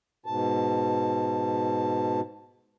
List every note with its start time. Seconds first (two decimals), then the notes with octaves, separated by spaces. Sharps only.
0.26 G#2 B2 A5